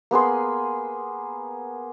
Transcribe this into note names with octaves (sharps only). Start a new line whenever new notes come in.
A#3 B3 G#4 C6